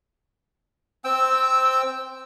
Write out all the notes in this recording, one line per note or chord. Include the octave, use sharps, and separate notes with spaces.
C4 G5 E6